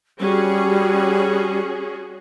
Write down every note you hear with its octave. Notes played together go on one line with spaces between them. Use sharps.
G3 C#4 F#4 G#4